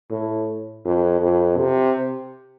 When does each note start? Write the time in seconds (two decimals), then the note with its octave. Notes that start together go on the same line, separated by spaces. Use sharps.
0.11 A2
0.85 F2
1.21 F2
1.57 C3